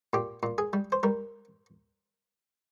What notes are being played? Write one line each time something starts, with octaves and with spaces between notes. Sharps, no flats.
A#2 G4
A#2
G#4
G3
C5
G3 A#4